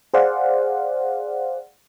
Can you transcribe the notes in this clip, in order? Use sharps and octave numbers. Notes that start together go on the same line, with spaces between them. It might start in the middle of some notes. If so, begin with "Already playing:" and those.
G#4 C5 D5 F5 F#5